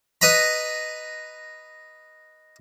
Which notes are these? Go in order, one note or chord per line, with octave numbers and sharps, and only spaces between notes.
B4 D#5 A#5 B5